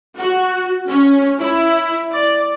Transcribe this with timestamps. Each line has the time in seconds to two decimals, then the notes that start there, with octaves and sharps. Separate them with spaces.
0.17 F#4
0.89 C#4
1.39 E4
2.11 D5